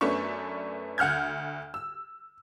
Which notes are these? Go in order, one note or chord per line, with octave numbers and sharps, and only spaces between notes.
F#2 A3 B3 C#4 D4 C#6
D2 F#5 F6 G6 G#6
E6